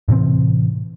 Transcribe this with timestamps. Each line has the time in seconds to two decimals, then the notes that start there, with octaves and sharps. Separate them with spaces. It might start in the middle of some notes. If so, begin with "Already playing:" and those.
0.08 A2 C3 E3 C4